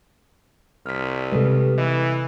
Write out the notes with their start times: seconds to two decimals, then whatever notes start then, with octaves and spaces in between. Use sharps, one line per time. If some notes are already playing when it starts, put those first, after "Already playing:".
0.86 C2 F6 B6
1.32 C3 G3 G#3 G4 A4 B4
1.78 E3 D#5